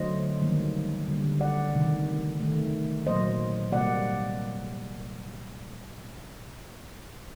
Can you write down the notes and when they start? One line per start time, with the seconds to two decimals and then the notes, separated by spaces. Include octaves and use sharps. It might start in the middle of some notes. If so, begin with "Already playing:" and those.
Already playing: D3 F#3 A3 C5 D#5
0.42 D#3 G3 A#3
1.08 D3 G3 A#3
1.41 D5 F#5
1.74 C3 D#3 A3
2.40 C3 D#3 A3
3.06 A#2 F#3 A#3 C5 D#5
3.72 C3 G3 A#3 D5 F#5